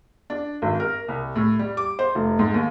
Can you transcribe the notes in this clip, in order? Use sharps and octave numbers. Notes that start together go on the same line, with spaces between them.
D4
G#1
A#4
C2
A2
G3
D6
C5
F1
G#2
D#2